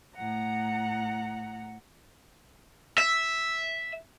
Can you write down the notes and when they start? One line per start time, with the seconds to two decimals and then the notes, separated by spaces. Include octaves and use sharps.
0.15 A2 F#5 A#5
2.98 E5